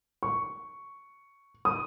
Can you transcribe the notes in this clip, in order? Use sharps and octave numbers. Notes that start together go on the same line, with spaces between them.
C#6
D#6